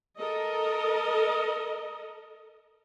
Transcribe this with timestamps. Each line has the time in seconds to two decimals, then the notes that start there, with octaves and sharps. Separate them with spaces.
0.18 A4 A#4 D#5